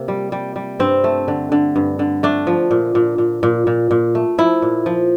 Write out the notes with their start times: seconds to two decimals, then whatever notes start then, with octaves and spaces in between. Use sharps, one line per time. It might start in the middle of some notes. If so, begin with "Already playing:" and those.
Already playing: C3 A#3
0.08 G3
0.32 G3
0.56 G3
0.79 G2 C4
1.04 A3
1.28 D3
1.52 D3
1.76 G2
1.99 D3
2.23 A3 D4
2.47 F3
2.71 A#2
2.95 A#2
3.18 A#2
3.43 A#2
3.67 A#2
3.91 A#2
4.15 A3
4.38 F3 E4
4.62 A#2
4.86 F3